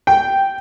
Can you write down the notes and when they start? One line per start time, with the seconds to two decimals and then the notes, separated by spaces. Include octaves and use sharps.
0.07 G5